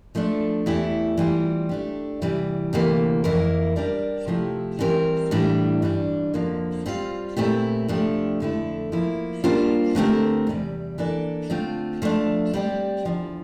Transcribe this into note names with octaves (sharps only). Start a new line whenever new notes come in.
F3 A3 D4
E2 E3 A3 E4 G4
E3 G3 C4 F4
A3 D4 G4
E2 C3 E3 G3
D2 C3 E3 A#3
F2 E3 A#3 E4 A#4
G3 D4 G4 A#4 D5
C3 F3 A3 E4 G4
E3 G3 C4 G4 A#4
A2 E3 G3 D4
G2 E3 G3 D4
F2 D3 F3 A#3
G3 C4 F4 C5 F5
A#2 A3 C4 E4 G4
C3 F3 A3 D4 G4
F2 D3 A3 E4
F3 A#3 E4
G3 A#3 D4 F4 C5
D3 A3 C4 G4 A#4
E2 C3 G3
E3 A#3 D4 A4 D5
D3 A3 C4 F4
F3 A3 D4
G3 C4 G4 D5
E2 D3 F3